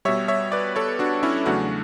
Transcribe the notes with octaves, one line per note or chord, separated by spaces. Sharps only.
B2 G3 C#5 E5
C#5 E5
B4 D5
A4 C#5
D4 F#4
C#4 E4
E2 C#3 F#3 A3 D4 F#4